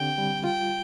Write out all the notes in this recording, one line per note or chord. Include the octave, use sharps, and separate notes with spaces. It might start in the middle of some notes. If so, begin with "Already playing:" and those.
Already playing: D3 C4 G4 G5
G3
F4 G5